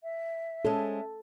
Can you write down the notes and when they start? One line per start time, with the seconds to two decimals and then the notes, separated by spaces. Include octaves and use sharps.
0.03 E5
0.65 G#3 C#4 A4 C5